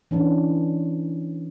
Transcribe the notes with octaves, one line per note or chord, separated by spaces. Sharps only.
E3 C#4 D4